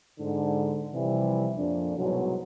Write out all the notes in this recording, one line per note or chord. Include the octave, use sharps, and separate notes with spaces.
G#2 D3
C3 E3 F3 G3
F2 A#2 D4
C2 G#2 B2 F#3